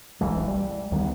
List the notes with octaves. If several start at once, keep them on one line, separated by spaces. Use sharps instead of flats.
D1 B1 E3 G#3
G3
D2 D#3 G3 B3